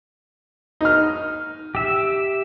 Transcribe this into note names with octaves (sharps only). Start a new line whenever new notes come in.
D#4 F6
G4 E5